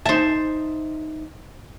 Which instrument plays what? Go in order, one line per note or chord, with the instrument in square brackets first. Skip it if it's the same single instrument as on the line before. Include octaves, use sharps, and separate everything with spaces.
[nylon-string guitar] D#4 E5 [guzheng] C5 A5